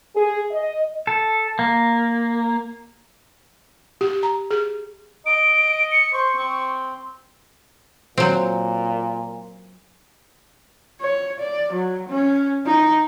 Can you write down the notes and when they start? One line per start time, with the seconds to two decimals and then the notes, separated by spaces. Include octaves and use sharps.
0.15 G#4
0.51 D#5
1.07 A4
1.59 A#3
4.01 G4
4.23 A#5
4.51 G#4
5.26 D#5 D7
5.92 C#7
6.13 C5 C#6
6.37 C4
8.18 A#2 F#3 C4
11.01 C#5
11.39 D5
11.72 F#3
12.09 C#4
12.66 D#4